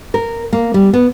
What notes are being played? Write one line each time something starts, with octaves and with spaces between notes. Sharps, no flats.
A#4
A#3
G3
B3